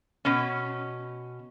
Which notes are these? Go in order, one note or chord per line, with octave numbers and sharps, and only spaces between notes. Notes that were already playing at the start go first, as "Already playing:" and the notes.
B2 C#4